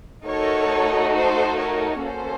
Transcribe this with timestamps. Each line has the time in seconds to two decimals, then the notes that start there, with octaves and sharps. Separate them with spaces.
0.25 A3 D#4 F#4 A4 A#4 C#5
1.14 A4 C5
1.57 A#4 C#5
2.02 A#3 C#4 F#4 A4 C5